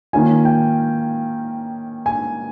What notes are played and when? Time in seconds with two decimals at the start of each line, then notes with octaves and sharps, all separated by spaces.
0.13 D#3 A#3 C#4 F4 G#5
0.45 G5
2.06 G#5